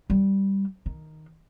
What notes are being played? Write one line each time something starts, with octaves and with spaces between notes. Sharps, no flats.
G3
D#3